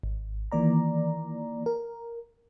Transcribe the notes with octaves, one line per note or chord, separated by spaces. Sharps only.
G#1
D#3 E3 A#3 D5 A#5
A#4